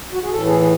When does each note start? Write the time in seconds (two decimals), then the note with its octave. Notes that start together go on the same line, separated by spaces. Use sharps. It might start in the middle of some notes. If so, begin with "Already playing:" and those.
0.12 F#4
0.23 G#4
0.32 A2 E3 A4
0.46 G#4
0.61 G#4